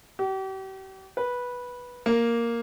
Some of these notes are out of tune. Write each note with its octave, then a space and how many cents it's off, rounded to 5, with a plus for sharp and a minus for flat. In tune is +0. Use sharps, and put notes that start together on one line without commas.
G4 -40
B4 -10
A#3 +0